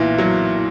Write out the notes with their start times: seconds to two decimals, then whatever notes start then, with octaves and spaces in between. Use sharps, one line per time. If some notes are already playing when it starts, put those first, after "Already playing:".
Already playing: B1 A#2 E3
0.18 F#3